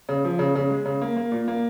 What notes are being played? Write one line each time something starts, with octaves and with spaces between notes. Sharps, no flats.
C#3
F3
C#3
C#3
G#3
C#3
A#3
A#3
A#2
A#3